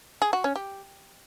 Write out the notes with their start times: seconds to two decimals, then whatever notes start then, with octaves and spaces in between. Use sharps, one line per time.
0.22 G#4
0.33 F#4
0.44 C#4
0.56 G4